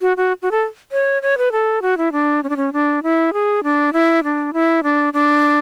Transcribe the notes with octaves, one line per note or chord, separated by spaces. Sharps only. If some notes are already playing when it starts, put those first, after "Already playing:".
F#4
F#4
F#4
A4
C#5
C#5
B4
A4
F#4
E4
D4
C#4
D4
C#4
D4
E4
G#4
D4
E4
D4
E4
D4
D4